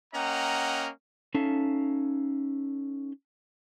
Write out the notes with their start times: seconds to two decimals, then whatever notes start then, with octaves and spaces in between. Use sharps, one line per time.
0.14 A#3 C#4 D#5 F#5 G5 A#5
1.34 C#4 D#4 A4 E5 F5 A5